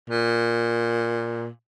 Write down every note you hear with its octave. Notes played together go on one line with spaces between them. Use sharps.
A#2